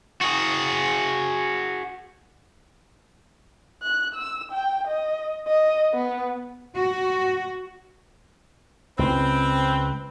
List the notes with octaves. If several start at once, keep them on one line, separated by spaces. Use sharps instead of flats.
F#4 G#4
F#6
E6
G5
D#5
D#5
B3
F#4
C#2 C4 B4